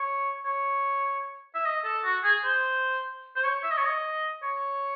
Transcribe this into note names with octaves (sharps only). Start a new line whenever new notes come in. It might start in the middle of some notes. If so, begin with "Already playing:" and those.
Already playing: C#5
C#5
E5
D#5
A4
F#4
G#4
C5
C5
C#5
E5
D#5
C#5
D#5
C#5